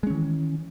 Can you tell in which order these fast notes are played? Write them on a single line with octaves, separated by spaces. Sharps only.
G#3 C#4 D#3 E3